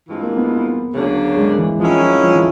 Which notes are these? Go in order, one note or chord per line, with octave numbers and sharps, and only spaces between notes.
G2 E3 G#3 C4 F4
A#3
B3
D2 C#3 F#3 A#3 D4
G#3
E3
D#3 F3 G#3 C#4 E4
F3
F3
E3